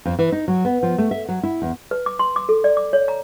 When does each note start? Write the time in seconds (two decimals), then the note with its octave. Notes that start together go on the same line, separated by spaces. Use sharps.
0.05 F2
0.19 E3
0.32 D#4
0.48 F#3
0.65 B3
0.83 F3
0.98 A3
1.11 E5
1.29 F#3
1.43 E4
1.62 E2
1.91 B4
2.06 D6
2.19 C6
2.36 D6
2.49 A4
2.64 D5
2.77 D6
2.93 C#5
3.08 A#5